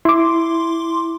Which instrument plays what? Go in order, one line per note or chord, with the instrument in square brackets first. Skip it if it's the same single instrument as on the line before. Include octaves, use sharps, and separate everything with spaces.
[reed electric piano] E4 [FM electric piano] C6 D6